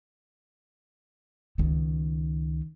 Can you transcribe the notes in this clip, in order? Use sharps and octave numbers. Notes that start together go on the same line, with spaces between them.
C#2 D#3